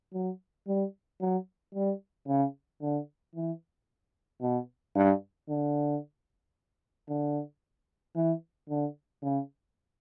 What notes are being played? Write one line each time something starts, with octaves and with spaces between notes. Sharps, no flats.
F#3
G3
F#3
G3
C#3
D3
E3
B2
G2
D3
D3
E3
D3
C#3